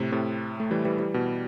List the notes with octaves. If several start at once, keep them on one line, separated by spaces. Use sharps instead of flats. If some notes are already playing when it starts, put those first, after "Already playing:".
Already playing: A2 C3
A2 C3
A3
E3 G3
E3 G3
E3 G3
B2